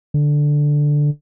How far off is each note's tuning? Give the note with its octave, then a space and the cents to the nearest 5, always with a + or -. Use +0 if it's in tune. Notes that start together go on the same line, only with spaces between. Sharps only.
D3 +0